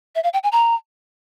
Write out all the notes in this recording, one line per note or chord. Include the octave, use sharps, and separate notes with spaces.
E5
F5
G5
G#5
A#5